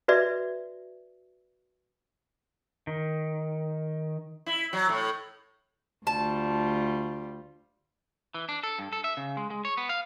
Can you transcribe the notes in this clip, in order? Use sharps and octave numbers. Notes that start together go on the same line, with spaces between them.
F#4 B4 D5 E5
D#3
E4
F#3
A2
D2 G3 F4 A5
E3
D4
A4
G2
A4
E5
C#3
G#3
G#3
C#5
B3
F5